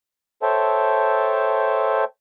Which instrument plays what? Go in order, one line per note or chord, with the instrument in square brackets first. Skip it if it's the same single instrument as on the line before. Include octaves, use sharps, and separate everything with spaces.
[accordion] A4 C5 C#5 E5 G5 A5